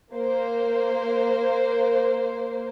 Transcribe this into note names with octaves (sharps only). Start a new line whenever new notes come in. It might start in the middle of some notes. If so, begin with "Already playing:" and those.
A#3 C5